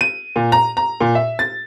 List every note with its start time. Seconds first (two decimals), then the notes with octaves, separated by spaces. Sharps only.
0.01 D#7
0.36 A#2
0.52 A#5
0.77 A#5
1.01 A#2
1.15 E5
1.39 A6